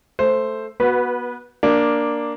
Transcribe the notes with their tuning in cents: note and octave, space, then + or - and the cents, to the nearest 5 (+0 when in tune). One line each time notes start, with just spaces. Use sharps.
A3 +0 C5 +0
B3 -25 F#4 +0 B4 +0
A#3 +5 D4 +0